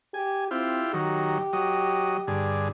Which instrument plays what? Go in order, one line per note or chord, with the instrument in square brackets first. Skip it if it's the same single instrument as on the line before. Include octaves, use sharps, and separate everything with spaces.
[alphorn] G4 [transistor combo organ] G#5
[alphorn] C4 [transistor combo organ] E4 F4 G4
[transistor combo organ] D#3 F#3 [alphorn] G4
[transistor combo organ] F#3 D#5
G2 D3 G#4